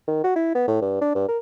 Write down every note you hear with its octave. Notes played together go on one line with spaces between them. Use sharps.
D#3
F#4
E4
B3
A2
G2
D4
G2
A#4